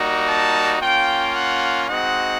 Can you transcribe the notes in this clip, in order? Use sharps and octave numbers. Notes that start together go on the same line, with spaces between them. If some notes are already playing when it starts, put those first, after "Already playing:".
Already playing: G3 A#3 D#4 F#4
A5
A#3 C#4 F4 G5
F#5
G#3 C4 D#4 F#4 F#5